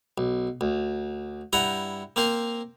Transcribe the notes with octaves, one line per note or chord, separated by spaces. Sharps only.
B1
D2
G2 E4 F#5 G5 A#5
A#3 C4 A#4 C5